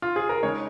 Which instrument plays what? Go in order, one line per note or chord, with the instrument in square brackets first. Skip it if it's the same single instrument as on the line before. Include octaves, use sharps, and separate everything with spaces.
[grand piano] F4
G#4
A#4
C#3 G#3 D#4 C#5